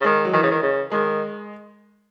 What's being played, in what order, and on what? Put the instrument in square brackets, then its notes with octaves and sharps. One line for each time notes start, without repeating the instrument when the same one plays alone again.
[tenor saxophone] C#3
[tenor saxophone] D#3 [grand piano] G#3
[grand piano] F#3
[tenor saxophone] D#3 [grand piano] E3
[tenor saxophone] C#3
D#3
C#3
[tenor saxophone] D#3 [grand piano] G#3